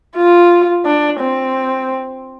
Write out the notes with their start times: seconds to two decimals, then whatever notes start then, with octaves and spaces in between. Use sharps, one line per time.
0.17 F4
0.86 D4
1.20 C4